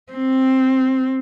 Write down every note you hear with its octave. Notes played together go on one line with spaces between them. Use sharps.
C4